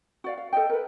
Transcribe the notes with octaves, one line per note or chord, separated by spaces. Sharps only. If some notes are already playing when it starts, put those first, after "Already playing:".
F#4 D5 F5
F5
A4 C5 D#5 G5
A#4 B4